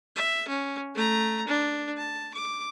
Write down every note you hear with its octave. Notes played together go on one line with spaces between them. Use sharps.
E5
C#4
A3 A#5
D4
A5
D6